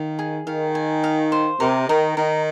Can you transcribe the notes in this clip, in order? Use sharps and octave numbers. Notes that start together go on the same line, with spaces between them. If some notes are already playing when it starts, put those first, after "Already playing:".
Already playing: D#3 F5
G#4
D#3 F5
G#5
F5
C5
C3 A#4
D#3 A#4
D#3 A#4